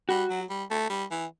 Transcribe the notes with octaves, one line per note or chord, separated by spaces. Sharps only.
G3 F#4
F#3
G3
A3
G3
E3